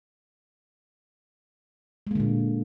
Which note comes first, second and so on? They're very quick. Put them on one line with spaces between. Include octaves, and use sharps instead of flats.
G#3 A#3 D3 A#2